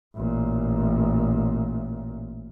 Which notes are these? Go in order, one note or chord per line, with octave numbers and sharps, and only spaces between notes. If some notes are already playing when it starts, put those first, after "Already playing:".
A1 A#2